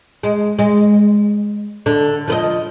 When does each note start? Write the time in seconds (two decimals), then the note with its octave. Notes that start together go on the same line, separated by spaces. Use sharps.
0.23 G#3
0.59 G#3
1.86 D3
2.27 F3 B4 D#5